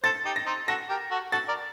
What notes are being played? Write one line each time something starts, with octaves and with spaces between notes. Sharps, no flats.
A4 C5 A6
D#4 G4
A#6
C4 D#4
F#4 A4 A#6
G4 A#4
F#4 A4
F#4 A4 A6
A#4 D5